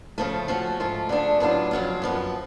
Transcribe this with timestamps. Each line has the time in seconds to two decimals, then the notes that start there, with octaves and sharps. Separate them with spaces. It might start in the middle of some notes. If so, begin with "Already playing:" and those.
0.18 C#3 F3 A3 F4
0.48 F3 A3 C#4 F#4
0.80 G#2 F3 A3 F4
1.09 D3 F3 A3 D4 G#4
1.40 A2 F#3 B3 D4 F4
1.71 F2 C#3 F#3 C#4 F4
2.02 F#2 F3 B3